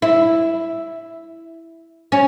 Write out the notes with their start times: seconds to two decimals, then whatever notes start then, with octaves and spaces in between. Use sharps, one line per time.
0.02 E4
2.12 C#4